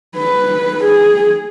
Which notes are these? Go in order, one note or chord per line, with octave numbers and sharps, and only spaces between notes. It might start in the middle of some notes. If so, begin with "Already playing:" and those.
B4
G#4